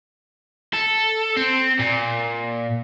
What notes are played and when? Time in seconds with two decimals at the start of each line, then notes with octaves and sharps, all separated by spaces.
0.73 A4
1.36 C4
1.79 A#2